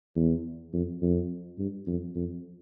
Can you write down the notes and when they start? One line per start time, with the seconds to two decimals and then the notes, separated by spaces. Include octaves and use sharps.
0.16 E2
0.73 F2
1.02 F2
1.59 G2
1.87 F2
2.16 F2